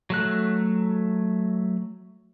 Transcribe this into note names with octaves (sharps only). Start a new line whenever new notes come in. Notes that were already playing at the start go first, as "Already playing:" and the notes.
F#3 A3 F#6